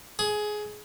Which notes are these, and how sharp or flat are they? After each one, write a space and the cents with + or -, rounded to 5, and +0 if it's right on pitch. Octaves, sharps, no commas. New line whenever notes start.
G#4 +15